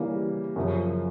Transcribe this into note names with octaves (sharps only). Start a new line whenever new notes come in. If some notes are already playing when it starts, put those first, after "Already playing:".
Already playing: C#3 E3 G3 A#3
F#2 C#3 F3